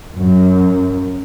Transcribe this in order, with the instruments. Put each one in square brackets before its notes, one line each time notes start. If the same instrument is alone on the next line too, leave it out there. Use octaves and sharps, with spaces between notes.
[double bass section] F#2